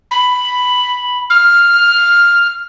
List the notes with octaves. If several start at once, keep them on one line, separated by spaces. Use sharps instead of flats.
B5
F6